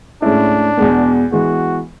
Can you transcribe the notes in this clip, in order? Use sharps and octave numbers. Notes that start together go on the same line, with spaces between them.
A2 G#3 C#4 D4 E4
E2 B2 G#3 B3
E3 G#3 B3 F#4